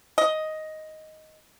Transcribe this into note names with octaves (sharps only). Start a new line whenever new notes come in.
D#5